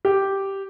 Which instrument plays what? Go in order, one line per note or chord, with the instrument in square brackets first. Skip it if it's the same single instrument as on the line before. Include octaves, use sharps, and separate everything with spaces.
[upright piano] G4